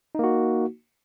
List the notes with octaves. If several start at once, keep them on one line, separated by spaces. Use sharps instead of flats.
A#3 D#4 F#4